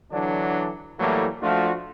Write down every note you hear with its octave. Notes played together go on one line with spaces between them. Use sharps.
D3 E3 F#3 D4
A2 E3 F#3 G3 A3 A#3
F3 A3 D4 F4 F#4